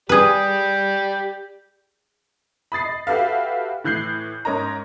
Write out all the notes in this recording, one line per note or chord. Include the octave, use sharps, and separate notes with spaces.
G4 G#4 B4 D5
B5 D#6 A6 C7
D#5
F#4 G4 A4 B4 E5 F5
A2 E3 F#6 G6 C7
G#2 C#4 A#4 D#5 A#5